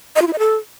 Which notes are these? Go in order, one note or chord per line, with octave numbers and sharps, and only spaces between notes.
D#5
F4
E4
D#5
A4